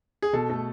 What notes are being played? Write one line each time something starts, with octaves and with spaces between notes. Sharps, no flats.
G#4
B2 A4
A3